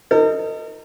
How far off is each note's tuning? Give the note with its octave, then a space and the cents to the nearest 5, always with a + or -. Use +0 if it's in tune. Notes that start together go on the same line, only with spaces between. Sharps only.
D#4 +10 A#4 -45